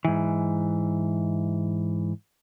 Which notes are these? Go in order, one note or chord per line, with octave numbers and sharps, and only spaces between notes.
G#2 E3